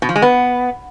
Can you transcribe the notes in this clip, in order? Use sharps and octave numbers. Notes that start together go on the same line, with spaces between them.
B2
F3
G#3
B3